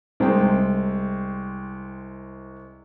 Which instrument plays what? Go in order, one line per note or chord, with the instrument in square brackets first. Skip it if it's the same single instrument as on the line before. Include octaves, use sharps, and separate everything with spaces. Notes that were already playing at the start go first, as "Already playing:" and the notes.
[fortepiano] C2 G#3 C5 G5